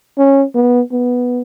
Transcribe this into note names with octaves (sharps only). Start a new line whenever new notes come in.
C#4
B3
B3